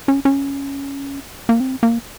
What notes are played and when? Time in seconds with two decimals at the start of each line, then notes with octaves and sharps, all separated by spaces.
0.08 C#4
0.25 C#4
1.49 A#3
1.60 C4
1.83 A#3